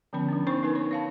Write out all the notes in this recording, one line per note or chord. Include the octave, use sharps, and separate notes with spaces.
D3 F3 B3 C#4 B5
F3 D4
B3 C4 D#4 C5 B5 C#6
D#4 A#4 B4 G#5
C#5 B5
C#5 F5 A5